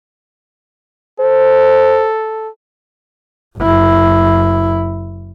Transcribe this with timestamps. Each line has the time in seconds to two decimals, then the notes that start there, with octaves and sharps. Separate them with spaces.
1.20 A4 C5
3.58 F#1 E4